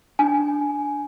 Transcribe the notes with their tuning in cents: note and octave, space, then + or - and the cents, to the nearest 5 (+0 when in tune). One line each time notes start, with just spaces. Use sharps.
D4 -5 G#5 +10